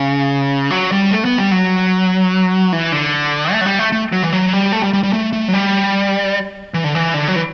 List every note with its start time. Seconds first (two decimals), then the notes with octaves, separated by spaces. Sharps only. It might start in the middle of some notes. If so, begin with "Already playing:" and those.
Already playing: C#3
0.71 F#3
0.92 G3
1.11 A3
1.25 B3
1.38 G3
1.51 F#3
2.73 E3
2.92 D3
3.52 A3
3.61 F#3
3.66 G3
3.79 A3
3.92 A3
4.12 F#3
4.23 E3
4.33 F#3
4.53 G3
4.72 A3
4.83 G3
4.93 G3
5.03 G3
5.13 A3
5.33 A3
5.48 F#3
5.54 G3
6.74 E3
6.84 D3
6.95 E3
7.14 D3
7.28 F#3
7.36 E3